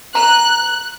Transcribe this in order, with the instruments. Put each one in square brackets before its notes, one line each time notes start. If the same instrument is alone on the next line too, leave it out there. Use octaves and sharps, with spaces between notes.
[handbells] A#5 [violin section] F#6